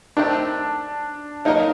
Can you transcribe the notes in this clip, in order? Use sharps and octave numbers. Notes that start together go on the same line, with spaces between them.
D#3 A3 C4 D4 D#4 G4
F#3 A#3 D#4 F#4 A#4 D#5